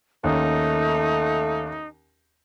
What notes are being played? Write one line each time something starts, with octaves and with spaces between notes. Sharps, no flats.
D#2 A3 C#4 D#4